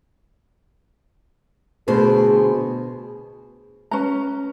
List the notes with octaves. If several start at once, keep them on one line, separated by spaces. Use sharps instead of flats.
D2 B2 G#4 C5
C#4 B4 A#5